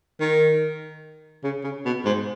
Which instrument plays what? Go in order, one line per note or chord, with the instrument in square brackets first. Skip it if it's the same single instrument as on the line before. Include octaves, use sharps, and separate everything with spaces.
[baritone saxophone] D#3
C#3
C#3
B2
G#2